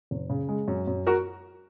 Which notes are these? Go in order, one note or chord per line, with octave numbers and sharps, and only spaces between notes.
F#1
C#3
G#3
F#2
F#2
F#4 A#4